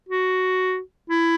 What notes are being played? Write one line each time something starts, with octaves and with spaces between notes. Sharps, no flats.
F#4
E4